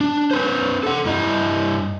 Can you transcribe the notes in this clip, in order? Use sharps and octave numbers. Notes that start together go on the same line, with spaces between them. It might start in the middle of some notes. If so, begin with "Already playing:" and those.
D4
C#4 B4 C5
A4 F#5
G2 E4 D#5